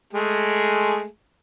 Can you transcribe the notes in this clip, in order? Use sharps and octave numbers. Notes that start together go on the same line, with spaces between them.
G#3 A3 G#4